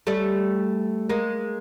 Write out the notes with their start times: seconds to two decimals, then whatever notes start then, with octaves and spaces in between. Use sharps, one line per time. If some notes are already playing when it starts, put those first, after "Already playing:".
0.07 G3 A3
1.09 G#3 A#3